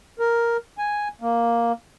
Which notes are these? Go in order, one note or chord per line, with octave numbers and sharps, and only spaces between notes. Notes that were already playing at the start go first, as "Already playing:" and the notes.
A#4
G#5
A#3